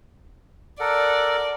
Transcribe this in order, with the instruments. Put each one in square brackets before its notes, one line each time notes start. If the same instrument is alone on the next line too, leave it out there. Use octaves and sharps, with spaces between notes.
[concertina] A4 A#4 F#5 [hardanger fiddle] D5